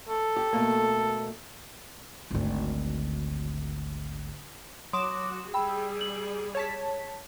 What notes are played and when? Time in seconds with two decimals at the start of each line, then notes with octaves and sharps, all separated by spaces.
0.09 A4
0.36 G4
0.53 B2 A3 A#3
2.31 G#1 D2
4.93 F#3 F#4 C6 D6 D#6 E7
5.54 G3 G#4 G5 B5 E6
6.01 F#7
6.55 C#5 A5 B6